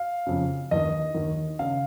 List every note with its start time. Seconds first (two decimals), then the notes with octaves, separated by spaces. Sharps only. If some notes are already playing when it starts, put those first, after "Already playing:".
Already playing: F5
0.27 F2 C#3
0.71 D#2 D#3 D#5
1.14 D#2 D#3
1.59 C#3 F5